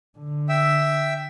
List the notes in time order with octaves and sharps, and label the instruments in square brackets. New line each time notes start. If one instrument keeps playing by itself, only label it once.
[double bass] D3
[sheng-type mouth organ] E5 G5 E6